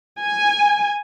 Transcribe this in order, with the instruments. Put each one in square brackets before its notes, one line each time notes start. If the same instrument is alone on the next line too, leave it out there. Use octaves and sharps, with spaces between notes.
[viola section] G#5